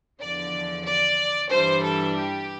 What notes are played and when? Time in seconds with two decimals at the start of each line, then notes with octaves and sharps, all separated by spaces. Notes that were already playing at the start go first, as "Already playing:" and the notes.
0.20 E2 D3 F3 D5
0.85 D5
1.50 G2 E3 G3 D4 C5
1.83 A4
2.16 G4